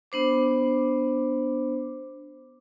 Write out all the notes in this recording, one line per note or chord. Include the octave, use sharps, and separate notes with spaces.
B3 D4 C5 D6